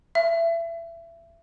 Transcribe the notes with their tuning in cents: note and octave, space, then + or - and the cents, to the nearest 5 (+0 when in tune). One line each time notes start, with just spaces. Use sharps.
E5 +25